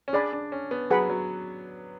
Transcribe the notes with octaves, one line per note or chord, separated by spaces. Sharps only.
C#4
D4 G#4 D5 G#5 B5
D4
C#4
B3
F#3 G#4 B4 F#5 B5
F#3